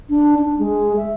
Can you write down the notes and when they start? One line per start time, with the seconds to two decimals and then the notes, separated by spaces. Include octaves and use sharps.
0.10 D4
0.39 D4
0.59 G#3
0.97 E5